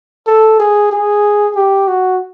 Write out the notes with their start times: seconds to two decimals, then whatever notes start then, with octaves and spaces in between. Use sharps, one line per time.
0.27 A4
0.59 G#4
0.91 G#4
1.56 G4
1.88 F#4